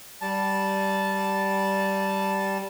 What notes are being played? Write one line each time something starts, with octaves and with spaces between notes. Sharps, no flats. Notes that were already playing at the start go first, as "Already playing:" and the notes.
G3 A5